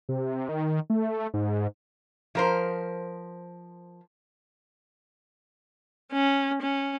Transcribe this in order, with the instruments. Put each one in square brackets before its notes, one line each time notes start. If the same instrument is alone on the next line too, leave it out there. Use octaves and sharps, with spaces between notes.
[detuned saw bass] C3
D#3
A3
G#2
[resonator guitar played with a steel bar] F3 A#4 C5
[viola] C#4
C#4